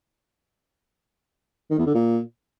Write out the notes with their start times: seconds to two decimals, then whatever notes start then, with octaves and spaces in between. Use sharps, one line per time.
1.70 D#3
1.78 E2
1.86 D3
1.94 A#2